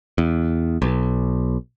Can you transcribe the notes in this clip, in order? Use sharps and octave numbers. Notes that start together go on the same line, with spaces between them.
E2
B1